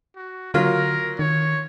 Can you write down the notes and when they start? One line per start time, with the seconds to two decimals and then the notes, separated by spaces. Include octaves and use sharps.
0.16 F#4
0.54 D3 F#3 A#3 F4 A#4
1.19 D#3 C#5